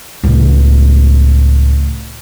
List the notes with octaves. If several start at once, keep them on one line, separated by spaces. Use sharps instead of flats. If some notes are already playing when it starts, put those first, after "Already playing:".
C#2 A2